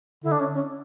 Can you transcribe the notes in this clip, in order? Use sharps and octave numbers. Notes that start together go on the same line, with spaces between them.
D3 E4
D4
C#4
C#4